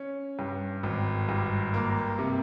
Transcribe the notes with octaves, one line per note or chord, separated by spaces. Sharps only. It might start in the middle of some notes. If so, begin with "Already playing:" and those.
Already playing: C#4
G2
G#1
G2
A#3
C3